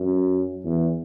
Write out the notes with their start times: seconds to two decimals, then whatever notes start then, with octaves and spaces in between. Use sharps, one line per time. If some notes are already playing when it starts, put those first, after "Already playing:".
Already playing: F#2
0.64 E2